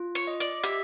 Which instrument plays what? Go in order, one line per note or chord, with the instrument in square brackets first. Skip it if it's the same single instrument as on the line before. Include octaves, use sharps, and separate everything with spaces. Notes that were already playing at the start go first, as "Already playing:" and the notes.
Already playing: [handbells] F4
[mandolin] C#5
[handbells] D#5
[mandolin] D5
[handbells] G4 [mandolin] E5